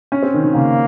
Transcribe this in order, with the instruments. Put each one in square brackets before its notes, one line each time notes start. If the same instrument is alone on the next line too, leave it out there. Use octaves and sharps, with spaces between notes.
[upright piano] C#4
C4
D#3
D#3
[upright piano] C#3 [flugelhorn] A#3